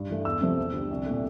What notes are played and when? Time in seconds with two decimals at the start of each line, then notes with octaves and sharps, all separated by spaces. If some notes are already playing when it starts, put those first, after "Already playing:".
Already playing: G2
0.10 E3 A3
0.25 E2 E6
0.41 C3 F3 A3
0.57 E2
0.74 D3 G3
0.90 C2
1.06 A#2 A3